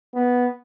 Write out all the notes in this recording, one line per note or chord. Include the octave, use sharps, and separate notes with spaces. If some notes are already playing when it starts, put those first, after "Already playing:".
B3